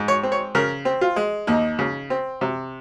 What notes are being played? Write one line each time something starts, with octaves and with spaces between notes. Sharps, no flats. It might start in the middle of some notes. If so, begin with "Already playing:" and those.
Already playing: G#2
C#5
C4
C#5
C#3 A#4
C4
F4
G#3
D#2 D#4
C#3
C4
C3